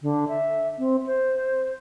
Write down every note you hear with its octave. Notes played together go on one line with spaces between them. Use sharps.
D3
E5
C4
C5